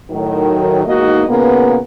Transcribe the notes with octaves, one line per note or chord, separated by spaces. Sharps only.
A2 D#3 F#3
E2 G#2 A#3 D#4 F#4 D#5
A#2 C#3 A#3 B3